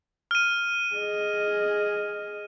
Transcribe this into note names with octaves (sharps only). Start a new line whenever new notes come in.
F6 D#7
G#4 D#5